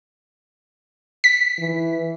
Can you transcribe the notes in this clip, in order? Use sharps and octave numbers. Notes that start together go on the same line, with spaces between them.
B6
E3